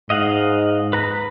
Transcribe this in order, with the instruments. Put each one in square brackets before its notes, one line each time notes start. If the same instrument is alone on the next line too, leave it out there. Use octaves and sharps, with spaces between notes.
[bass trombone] G#2 [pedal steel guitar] D#5 F5 F#5
[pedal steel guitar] B4 A#5 B5